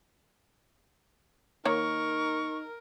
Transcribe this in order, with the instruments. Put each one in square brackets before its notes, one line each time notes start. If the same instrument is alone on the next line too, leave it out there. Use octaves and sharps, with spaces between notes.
[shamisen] D#3 A#3 C#5 [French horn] D#4 [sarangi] A#4 [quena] C#6